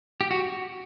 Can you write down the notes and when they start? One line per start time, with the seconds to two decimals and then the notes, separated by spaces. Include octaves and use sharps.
0.21 G4
0.31 F#4